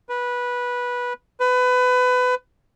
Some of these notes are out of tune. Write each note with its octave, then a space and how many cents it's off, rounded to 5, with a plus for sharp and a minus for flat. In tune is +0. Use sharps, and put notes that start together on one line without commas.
B4 -15
B4 +25